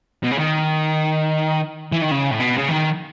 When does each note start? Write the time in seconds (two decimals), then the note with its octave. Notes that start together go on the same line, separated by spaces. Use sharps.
0.23 B2
0.31 C#3
0.38 D#3
1.92 E3
2.02 D#3
2.11 C#3
2.31 A2
2.40 B2
2.58 C#3
2.69 D#3